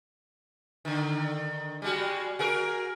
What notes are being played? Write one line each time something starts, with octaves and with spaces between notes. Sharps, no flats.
D3 D#3
G3 G#3 F#4
F#4 G#4 A#4